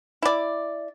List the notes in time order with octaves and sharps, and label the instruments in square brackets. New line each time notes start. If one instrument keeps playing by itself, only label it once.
[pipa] E4 D5